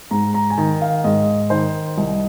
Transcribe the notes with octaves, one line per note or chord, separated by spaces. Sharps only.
G#2 A#5
A#5
G#5
D#3 A#5
F5
G#2 D#5
D#3 C5
C2 D#5